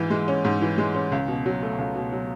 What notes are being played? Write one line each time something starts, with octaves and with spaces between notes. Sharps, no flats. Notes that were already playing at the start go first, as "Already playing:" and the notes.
Already playing: G#2 E3
G#3
C#4
G#2
E3
G#3
C#4
C#2
B2
F#3
A3
C#2
B2
F#3